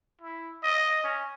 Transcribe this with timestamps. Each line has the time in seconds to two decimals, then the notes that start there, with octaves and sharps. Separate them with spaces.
0.21 E4
0.63 D#5
1.04 C#4